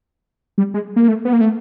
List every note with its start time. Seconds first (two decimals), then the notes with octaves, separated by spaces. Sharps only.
0.58 G3
0.74 G#3
0.96 A#3
1.08 A3
1.25 B3
1.33 A#3
1.41 A3